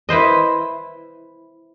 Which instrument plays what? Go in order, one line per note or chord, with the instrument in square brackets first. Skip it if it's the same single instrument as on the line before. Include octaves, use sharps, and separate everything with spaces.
[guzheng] E4 B4 C5 D#5